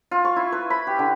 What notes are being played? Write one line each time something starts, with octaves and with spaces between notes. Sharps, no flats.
F4
C#6
E4
B4
B5
G4
D3